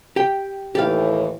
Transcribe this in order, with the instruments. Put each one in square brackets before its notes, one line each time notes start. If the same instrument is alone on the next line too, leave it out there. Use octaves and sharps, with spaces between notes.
[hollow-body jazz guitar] G4 G5
[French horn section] D#2 A2 E3 [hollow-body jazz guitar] G4 D5 F5